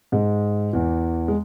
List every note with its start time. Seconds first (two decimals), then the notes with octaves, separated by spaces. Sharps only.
0.12 G#2 G#3
0.73 E2 E3
1.28 G#3